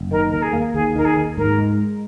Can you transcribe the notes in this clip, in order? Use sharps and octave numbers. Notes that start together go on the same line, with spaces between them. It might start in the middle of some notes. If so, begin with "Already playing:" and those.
Already playing: F#1
D#3 A#4
D#2 A#4
G#4
A#3
D#2 G#4
D#3 A#4
G#4
D#2
G#2 A#4
G#3